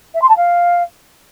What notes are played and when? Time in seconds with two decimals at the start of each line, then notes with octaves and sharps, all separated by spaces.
0.14 E5
0.21 C6
0.29 A5
0.36 F5